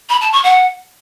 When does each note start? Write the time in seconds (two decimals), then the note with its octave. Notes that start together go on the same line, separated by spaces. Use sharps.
0.10 B5
0.21 A5
0.32 C#6
0.44 F#5